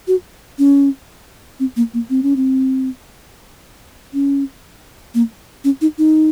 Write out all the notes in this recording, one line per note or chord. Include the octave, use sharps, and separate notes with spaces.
F#4
C#4
C4
A#3
A#3
C4
C#4
C4
C#4
A#3
C#4
D#4
D#4